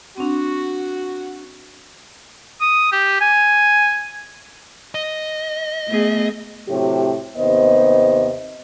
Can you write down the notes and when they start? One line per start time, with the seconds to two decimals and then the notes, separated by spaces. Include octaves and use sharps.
0.18 C4 D4 F#4
2.61 D#6
2.92 G4
3.21 G#5
4.95 D#5
5.88 A3 B3 G#4
6.68 A2 C3 F#3 G4
7.37 D#2 C3 B3 C5 D#5